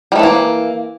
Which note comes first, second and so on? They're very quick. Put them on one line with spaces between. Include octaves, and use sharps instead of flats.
G3 A3 E3 A#3